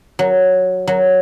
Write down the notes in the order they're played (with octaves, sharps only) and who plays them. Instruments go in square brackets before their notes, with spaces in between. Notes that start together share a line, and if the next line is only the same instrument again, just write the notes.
[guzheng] F#3
F#3